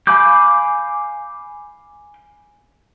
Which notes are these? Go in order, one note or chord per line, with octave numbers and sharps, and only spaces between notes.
F5 G#5 B5 D6 G6